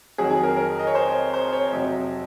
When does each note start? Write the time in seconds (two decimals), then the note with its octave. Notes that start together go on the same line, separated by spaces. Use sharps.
0.18 F2 D#3 F#3 G#4
0.31 G#4
0.43 A#4
0.57 A#4
0.79 D#5
0.87 C#5
0.95 C5
1.34 C5
1.53 C#5
1.72 F2 C3 F#3